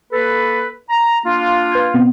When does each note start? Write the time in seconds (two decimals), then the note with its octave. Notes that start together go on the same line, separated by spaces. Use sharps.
0.11 A#3 A4 B4
0.89 A#5
1.24 A#3 D4 F4
1.71 B4 G6 G#6
1.94 B2 B3 C4